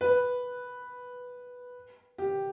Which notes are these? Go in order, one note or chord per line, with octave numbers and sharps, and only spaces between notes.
B4
G4